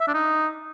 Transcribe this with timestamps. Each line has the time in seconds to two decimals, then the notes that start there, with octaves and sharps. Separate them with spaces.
0.01 E5
0.07 D4
0.14 D#4